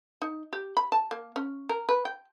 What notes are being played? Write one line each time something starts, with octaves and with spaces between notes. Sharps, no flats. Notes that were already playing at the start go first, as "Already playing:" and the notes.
D#4
G4
B5
A5
A#3
C#4
A#4
B4
G5